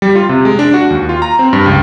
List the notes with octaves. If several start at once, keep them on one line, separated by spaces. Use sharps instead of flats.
G3
F4
C3
G#3
D4
F#4
D#2
F4
A#5
C4
G2
C#2